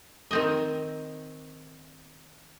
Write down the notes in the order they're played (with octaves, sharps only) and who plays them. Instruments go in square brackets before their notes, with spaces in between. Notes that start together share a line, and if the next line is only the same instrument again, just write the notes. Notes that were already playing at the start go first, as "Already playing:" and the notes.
[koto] D#3 C4 D#5